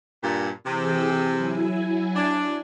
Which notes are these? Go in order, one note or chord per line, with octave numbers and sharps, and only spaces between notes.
G2 A#2
C3 E3 G#4 E6
F#3 E4 G#5
D4